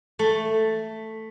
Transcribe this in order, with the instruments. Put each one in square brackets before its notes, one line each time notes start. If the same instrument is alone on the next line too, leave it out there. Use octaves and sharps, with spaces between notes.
[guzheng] A3